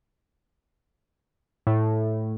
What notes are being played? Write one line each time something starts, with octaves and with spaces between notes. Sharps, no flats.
A2